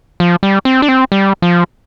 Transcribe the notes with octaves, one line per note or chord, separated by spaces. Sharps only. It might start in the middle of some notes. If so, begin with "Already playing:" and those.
F3
G3
C4
D4
C4
G3
F3